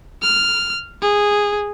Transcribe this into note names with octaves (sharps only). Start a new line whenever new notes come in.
F6
G#4